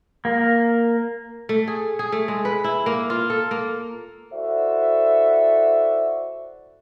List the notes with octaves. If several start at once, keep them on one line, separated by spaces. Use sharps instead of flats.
A#3
A3
G#4
G#4
A3
G#3
B4
E4
A#3
F4
A4
A#3
E4 F#4 A4 C5 D5 E5